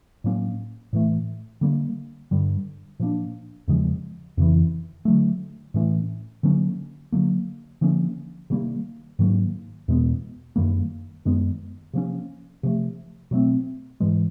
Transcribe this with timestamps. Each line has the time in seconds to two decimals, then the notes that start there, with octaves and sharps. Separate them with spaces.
0.24 A2 F#3 A#3 C#4
0.93 A2 E3 A3
1.61 D3 G3 A#3
2.31 G2 D3 G3
3.00 A#2 F3 A#3 D4
3.68 E2 C#3 F3 G#3
4.37 F2 C#3 E3
5.05 D3 F#3 A3
5.74 A2 E3 A3 C#4
6.43 D3 F#3 A#3 C#4
7.12 D3 F#3 A#3
7.81 D3 F3 A#3 C#4
8.50 C3 D#3 G3 A#3
9.19 G#2 D#3 F#3 A#3
9.88 E2 B2 G#3 B3
10.56 F#2 D#3 G3 A#3
11.25 F#2 D#3 G#3 B3
11.93 C3 F3 A#3 C#4
12.63 C3 F3 A3
13.31 B2 F#3 A3 C4
14.00 G#2 E3 G#3